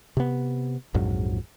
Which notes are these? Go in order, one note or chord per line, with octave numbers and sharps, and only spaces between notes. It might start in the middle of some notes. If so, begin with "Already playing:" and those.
C3 B3
A#1 F2 G#2 F#3